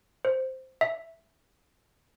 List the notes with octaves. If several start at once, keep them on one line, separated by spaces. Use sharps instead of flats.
C5
E5